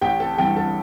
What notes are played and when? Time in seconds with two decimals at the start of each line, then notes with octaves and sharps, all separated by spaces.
0.01 A1 G4 G5
0.20 A4 A5
0.38 G2 E3 G4 G5
0.56 A4 A5